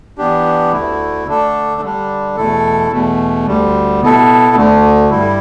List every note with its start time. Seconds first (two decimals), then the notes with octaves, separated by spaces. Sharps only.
0.18 E3 B3 D4 G4
0.72 D2 D3 A3 E4
1.27 D3 A3 D4 A4
1.82 D3 G3 D4
2.37 E2 B2 A3 E4 A4
2.92 E2 B2 A3
3.47 D2 D3 G3
4.01 B2 B3 E4 A4
4.56 D2 D3 A3
5.10 G2 G3 E4